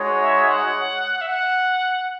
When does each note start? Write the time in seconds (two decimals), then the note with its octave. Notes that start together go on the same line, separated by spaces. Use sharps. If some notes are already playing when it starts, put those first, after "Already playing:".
Already playing: G#3 D#4 F#4 C#5
0.21 E5
0.48 F#5
1.21 E5
1.29 F#5